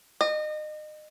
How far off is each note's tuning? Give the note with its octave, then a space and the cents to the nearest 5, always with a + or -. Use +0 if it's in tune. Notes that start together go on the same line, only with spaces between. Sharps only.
D#5 -30